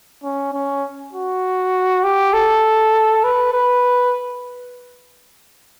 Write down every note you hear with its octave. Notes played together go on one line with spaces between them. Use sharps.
C#4
C#4
F#4
G4
A4
B4
B4